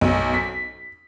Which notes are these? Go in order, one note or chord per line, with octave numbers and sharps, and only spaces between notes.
B1
B6